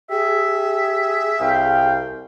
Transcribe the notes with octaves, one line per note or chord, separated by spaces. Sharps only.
G4 G#4 E5
C2 F5 G5